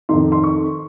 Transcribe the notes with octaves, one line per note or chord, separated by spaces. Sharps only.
F2 D#3 C6
C6
C#6